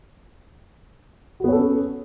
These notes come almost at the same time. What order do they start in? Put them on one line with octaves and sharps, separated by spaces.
F#4 B3 C#5 A4 C#4